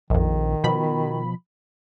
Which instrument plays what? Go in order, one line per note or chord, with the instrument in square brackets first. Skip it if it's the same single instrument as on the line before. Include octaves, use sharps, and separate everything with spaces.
[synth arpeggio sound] A#1 F2 [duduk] D#3
[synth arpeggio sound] B2 F3 B5